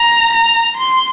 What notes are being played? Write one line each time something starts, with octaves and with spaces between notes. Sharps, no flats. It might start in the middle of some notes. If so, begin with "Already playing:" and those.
Already playing: A#5
A#5
C6